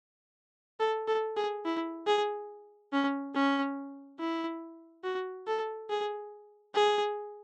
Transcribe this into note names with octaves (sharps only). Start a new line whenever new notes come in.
A4
A4
G#4
E4
G#4
C#4
C#4
E4
F#4
A4
G#4
G#4